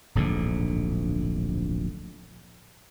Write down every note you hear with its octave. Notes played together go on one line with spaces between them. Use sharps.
D1 A#1 G#2 D3